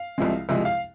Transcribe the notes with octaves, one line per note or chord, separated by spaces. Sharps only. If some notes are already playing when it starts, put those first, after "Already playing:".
Already playing: F5
C2 C3 F3 G#3
C2 C3 F3 G#3
F5